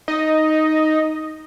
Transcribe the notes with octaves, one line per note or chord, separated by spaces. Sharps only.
D#4 D#5